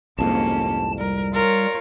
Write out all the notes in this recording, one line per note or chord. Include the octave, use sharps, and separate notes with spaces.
C2 F2 G#2 A#3 C#4 A5
G3 A#4
F4 A#4 C#5